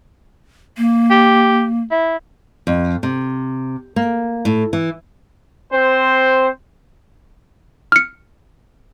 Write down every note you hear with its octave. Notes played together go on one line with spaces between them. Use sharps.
A#3
G4
E4
F2
C3
A#3
A2
E3
C4 C5
F6 C#7